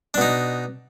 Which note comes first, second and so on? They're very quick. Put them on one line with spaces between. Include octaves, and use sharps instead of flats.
D4 B2 D#4